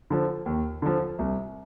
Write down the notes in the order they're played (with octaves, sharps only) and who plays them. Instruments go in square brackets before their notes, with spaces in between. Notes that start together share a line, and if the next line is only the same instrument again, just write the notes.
[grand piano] D3 F3
D#2
D3 F3
C2